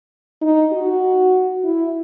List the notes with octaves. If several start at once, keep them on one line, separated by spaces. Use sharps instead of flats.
D#4
F#4
E4